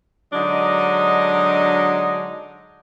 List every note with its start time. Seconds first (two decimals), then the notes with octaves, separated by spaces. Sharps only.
0.33 D3 F#3 G#3 D4 D#4 D#5